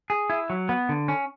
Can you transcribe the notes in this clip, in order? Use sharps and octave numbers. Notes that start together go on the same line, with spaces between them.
G#4
E4
F#3
B3
D3
C#4